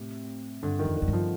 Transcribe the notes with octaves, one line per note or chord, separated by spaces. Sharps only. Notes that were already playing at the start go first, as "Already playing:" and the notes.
Already playing: A2 C3
G2 D3
D#3
F2
D#3
F2
G2
F3